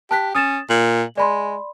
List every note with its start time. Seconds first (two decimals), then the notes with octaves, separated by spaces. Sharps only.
0.11 G4 A5 F#6 B6
0.35 C#4 D#6 A6 E7
0.70 A#2 F#7
1.17 G#3 D5 B5 C6